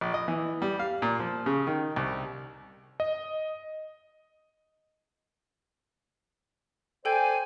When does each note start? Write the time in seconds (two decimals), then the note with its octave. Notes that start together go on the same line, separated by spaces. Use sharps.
0.01 A#1
0.14 D#5
0.28 E3
0.62 G3
0.79 F5
1.02 A#2
1.20 F3
1.46 C#3
1.67 D#3
1.96 C2
3.00 D#5
7.05 A4 C5 D5 G5 G#5 G6